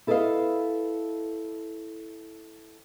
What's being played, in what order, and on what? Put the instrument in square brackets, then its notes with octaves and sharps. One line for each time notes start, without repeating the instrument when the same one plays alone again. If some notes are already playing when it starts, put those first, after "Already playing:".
[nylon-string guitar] E4 A4 B4 D5 D#5 F5